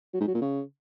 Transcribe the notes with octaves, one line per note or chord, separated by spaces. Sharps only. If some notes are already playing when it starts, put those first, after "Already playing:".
F#3
G#2
F#3
A#2
C#3